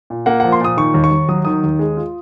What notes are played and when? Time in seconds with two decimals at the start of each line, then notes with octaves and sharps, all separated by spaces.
0.10 A#2
0.26 A#3 F#5
0.40 F3 F#5
0.52 C6
0.61 A#2 D#6
0.77 D#3 C#6
0.94 D#2
1.04 C#6
1.11 D#2
1.29 F#3 D#6
1.45 D#3 D#6
1.63 D#2
1.79 G#3
1.97 F4